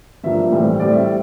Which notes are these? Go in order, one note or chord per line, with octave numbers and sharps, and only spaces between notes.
G2 F3 A#3 E5
A2 E3 G3 C4
A2 G3 C4 D5
E5